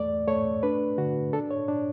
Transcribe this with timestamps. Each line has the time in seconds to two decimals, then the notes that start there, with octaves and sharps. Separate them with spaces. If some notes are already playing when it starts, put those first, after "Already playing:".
Already playing: E2 A3 D5
0.28 A3 C#5
0.63 D4 B4
0.98 D3 F#4
1.33 D4 A4
1.51 C#5
1.68 D4